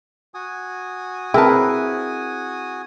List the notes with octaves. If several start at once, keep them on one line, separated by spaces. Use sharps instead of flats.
F#4 G#5 D#6
C4 E4 G#4 A#4 B4 G5 A5